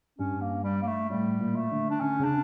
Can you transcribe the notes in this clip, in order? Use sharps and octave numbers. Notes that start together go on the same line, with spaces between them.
G2 C#4
A#3
G3
A#3
A3
A2 G3
A#2
A3
D3
D4
D3 C#4
C#3 D4